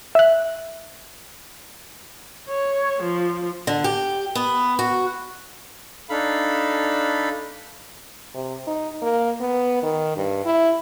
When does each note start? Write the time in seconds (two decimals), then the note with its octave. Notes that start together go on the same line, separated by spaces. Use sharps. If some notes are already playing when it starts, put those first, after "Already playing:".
0.15 E5 F#6
2.48 C#5
3.01 F3
3.67 D3
3.84 G4
4.35 B3
4.79 F#4
6.10 D4 D#4 A4 F5 B5
8.34 C3
8.67 D#4
9.02 A#3
9.40 B3
9.83 D#3
10.16 G2
10.45 E4